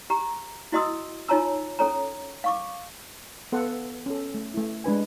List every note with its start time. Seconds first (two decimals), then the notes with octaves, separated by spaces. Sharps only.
0.10 G4 A#5
0.72 E4 F#4 D#5 C6 D#6 E6
1.28 D#4 F4 C#5 A5 A#5 E6
1.79 C#4 A4 C#5 A#5
2.44 F5 C#6 D6
3.52 B3 A4 F5 F#5
4.06 C#4 A4
4.34 A3
4.54 A3 E4
4.84 G#3 D4 B4 G#5